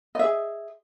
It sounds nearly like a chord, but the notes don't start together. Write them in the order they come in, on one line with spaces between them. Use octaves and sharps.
D#5 E5 G#4